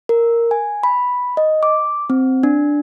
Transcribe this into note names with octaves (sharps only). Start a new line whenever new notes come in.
A#4
G#5
B5
D#5
D6
C4
D4